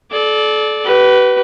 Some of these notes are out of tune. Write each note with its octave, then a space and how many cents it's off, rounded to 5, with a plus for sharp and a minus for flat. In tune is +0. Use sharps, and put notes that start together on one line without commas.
A4 -35 D5 +0
G4 -45 B4 +0